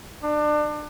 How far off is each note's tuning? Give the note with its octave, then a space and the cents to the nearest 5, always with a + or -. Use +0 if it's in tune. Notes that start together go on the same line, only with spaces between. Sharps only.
D4 +30